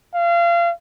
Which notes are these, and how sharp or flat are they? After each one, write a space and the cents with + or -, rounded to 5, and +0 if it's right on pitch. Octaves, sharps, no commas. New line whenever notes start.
F5 -30